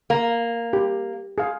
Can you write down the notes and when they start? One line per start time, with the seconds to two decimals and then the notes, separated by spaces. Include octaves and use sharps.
0.10 A#3
0.73 G4
1.38 G#4 F5